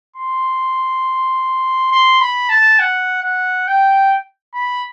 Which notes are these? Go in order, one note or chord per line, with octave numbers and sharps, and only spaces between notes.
C6
C6
B5
A5
F#5
F#5
G5
B5